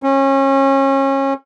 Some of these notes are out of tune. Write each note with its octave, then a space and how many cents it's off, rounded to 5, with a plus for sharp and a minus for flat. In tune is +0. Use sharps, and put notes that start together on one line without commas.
C#4 -30